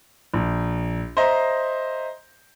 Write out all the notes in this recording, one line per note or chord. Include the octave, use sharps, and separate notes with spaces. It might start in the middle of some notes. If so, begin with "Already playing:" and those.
A#1
C5 D#5 E5 A#5 C6